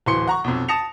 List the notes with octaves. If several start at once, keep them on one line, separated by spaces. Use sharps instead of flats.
D1 E3 C6 C#7
F#5 A#5 C#6
B1 F2
A5 D#6 A#6 C#7 F7